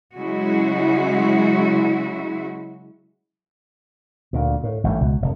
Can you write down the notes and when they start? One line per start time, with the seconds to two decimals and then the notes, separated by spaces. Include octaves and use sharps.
0.17 C#3 F#3 G#3 E4 F#4
4.33 D2 A#2
4.64 A2
4.84 A1 G2 A#2 A3
5.01 C#2 B2
5.22 F1